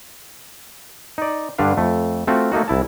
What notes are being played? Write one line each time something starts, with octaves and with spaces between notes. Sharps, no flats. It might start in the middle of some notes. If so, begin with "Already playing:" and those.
D#4 D5
G2 D3 D4 B4 F5
F2 A3
A3 C4 F4 F#4
A3 A#3 D#4 F#4
C2 E4 A5